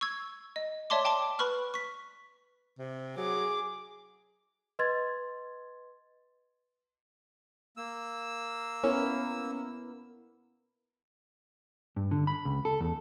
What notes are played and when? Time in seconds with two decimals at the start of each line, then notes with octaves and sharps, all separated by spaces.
0.01 C#6 E6 G#6
0.56 D#5
0.90 C#5 D5 E5 A5 C6 D6
1.05 G5 A5 C6 D6
1.39 B4 B5 C#6 F6
1.74 C#6 B6
2.79 C3
3.17 F#3 G#4 D6
4.79 B4 D#5 C6 G#6 A6
7.77 A#3 E6
8.84 B3 C#4 E4 A#4
11.96 G2
12.11 D3
12.27 B5
12.45 C#2
12.65 A4
12.80 E2